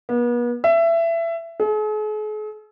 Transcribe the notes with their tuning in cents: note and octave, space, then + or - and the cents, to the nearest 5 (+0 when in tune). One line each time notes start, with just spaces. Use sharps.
B3 -40
E5 +20
G#4 +45